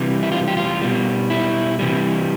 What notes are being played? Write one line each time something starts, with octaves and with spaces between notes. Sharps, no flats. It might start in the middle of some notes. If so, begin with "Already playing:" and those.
Already playing: C3 E3 G3
E4
F4
G4
F4
B2 G3
E4
C3 E3 G3